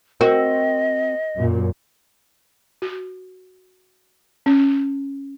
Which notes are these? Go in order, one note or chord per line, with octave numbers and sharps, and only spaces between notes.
C4 F#4 A#4 D#5
F#2 A#2
F#4
C#4